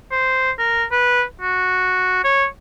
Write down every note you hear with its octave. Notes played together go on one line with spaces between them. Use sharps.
C5
A#4
B4
F#4
C#5